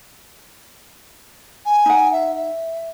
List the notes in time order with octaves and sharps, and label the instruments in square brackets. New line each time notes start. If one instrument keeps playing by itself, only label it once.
[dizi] G#5
[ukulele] D#4 F#5
[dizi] E5
E5